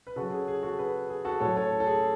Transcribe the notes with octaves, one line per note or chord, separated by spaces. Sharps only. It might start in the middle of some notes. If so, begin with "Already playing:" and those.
B4
C#3 F#3 F#4 A4
G#4
G#4
F#4 A4
G#4 B4
G#4
F#4 A4
A2 F#3 A4 C#5
A4 C#5
A4
G#4